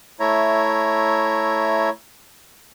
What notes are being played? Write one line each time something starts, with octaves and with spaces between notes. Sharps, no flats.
A3 E4 C#5 E5 A#5